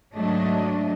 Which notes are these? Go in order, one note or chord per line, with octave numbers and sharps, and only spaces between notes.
G#2 F#3 A3 D4 D#5